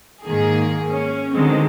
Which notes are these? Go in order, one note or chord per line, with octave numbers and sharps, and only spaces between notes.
G#2 D#3 A#3 G#4
C#4
D3 D#3 F#3 G#3 C4